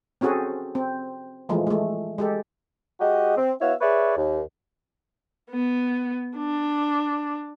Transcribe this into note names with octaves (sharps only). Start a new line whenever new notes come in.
C4 C#4 F#4 G#4 A4
C4
E3 F3 G#3 A3
G#3 A3
G#3 G4 A4
G#3 F#4 G4 D#5
C4
B3 E4 F#4 C#5 E5 F5
G#4 B4 C#5 D5 E5
D#2
B3
D4